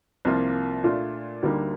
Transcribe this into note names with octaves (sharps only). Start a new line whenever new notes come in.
C2 C3 F3 A#3 F4
A#2 A3 D4 F4
D2 D3 G3 A#3 D#4